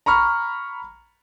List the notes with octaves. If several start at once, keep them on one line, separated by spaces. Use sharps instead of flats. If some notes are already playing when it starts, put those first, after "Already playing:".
A#5 B5 C#6 F6